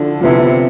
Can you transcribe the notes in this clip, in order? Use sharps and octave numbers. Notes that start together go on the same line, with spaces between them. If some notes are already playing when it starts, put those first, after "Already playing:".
Already playing: D3 F3 E4
C3 F3 B3 E4